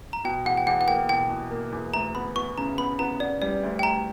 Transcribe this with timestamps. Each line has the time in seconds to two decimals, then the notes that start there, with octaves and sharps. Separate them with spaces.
0.13 A#5
0.24 B2 G5
0.45 E2 F#5
0.57 G5
0.66 E2 F#5
0.81 F#5
0.88 A#3 G5
1.09 B2 G5
1.30 B2
1.51 A#3
1.72 E2
1.94 D2 A#5
2.15 B3 B5
2.36 B3 C#6
2.58 C#3 A#5
2.78 B3 B5
2.99 B3 A#5
3.20 B3 D5
3.42 G3 D5
3.63 D2
3.79 G5
3.83 D2 A#5